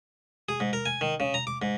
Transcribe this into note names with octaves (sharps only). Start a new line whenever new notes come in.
G#4
G#2
A#4
G#5
D#3
C#3
A#5
D6
G#2